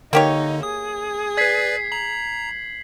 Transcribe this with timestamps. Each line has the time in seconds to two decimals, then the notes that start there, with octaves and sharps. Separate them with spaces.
0.13 D3 A#3 D#4 G4 C#5
0.63 G#4 D#6
1.37 B4 D5 G#6 B6 C7
1.92 A#5 F#7